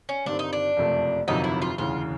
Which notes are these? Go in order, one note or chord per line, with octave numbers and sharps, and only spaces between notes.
C#4
G1 G2 D#3 G3 C4 D4
D#4
D4
F#1 F2 C3 F3 A3
G1 F2 C3 D#3 F#3 D#4
E4
F4
E1 D2 C#3 E3 F4